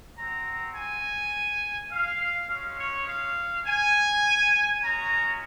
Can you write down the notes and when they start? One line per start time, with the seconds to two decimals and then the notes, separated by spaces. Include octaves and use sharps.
0.17 C4 F#4 A#5
0.76 G#5
1.92 F5
2.49 G#3 C#4 F#4 F5
2.79 C#5
3.08 F5
3.66 G#5
4.82 G#3 C#4 F#4 A#5